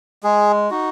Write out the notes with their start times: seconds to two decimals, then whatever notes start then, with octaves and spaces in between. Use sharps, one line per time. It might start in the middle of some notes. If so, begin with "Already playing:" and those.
0.23 G#3 G#4
0.70 D#4 F#4